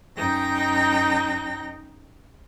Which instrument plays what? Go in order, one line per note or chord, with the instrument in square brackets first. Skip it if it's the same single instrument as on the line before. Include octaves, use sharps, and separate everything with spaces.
[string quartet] F#2 D#4 G5 A#6